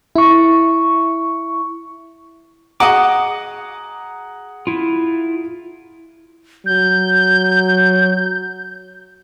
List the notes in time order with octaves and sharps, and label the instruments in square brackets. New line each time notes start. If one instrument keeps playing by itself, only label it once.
[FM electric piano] E4 C#6
[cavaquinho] F#4 D#5 D#6 [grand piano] G#4 F#5 A#5 [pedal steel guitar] D6
[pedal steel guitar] E4 F4
[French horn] F#3 [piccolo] G6